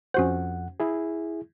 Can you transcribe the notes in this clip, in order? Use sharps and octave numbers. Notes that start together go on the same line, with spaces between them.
F2 C#4 F#4 C5 F#5
E4 G#4